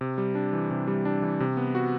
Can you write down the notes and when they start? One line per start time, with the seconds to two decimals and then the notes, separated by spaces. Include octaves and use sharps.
0.01 C3
0.18 G3
0.35 D4
0.53 E3
0.71 C3
0.87 G3
1.05 D4
1.22 E3
1.40 C3
1.57 B3
1.75 F#4